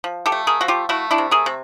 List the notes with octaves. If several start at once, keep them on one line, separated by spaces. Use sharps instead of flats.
F3
G4 A4
A3
G#4 A#4
F3 F#4
F4 G4
A3 E4 F#4
D4 E4
C3
G#4 A#4
C3